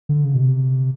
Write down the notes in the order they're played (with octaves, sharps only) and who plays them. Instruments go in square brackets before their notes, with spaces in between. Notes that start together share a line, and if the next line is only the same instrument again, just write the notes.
[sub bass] D3
C#3
B2
C3